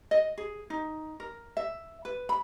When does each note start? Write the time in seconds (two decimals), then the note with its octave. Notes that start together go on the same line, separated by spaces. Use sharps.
0.11 D#5
0.38 G#4
0.70 D#4
1.20 A#4
1.57 E5
2.05 B4
2.29 B5